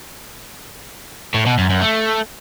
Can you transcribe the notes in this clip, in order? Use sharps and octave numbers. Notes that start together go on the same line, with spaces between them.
A2
B2
F#2
F#2
A3